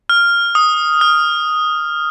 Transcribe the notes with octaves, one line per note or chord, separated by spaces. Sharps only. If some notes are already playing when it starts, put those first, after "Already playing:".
F6
D#6
F6